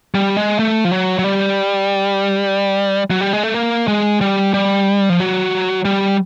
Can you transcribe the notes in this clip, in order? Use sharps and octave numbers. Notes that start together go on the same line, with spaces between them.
G3
G#3
A3
F3
F#3
F#3
G3
F#3
G3
G#3
A3
A#3
G#3
G3
G3
F3
F#3
G3